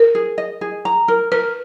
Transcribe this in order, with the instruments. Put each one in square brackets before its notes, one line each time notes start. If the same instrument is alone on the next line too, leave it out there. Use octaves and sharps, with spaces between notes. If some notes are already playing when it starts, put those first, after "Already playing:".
Already playing: [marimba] A#4
[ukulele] G#4
D#5
G#4
A#5
A#4
[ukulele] A#4 [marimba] B4